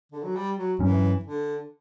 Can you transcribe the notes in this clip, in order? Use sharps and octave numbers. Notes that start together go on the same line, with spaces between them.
D3
F#3
G3
F#3
G2 E3 F#3 C#4
D3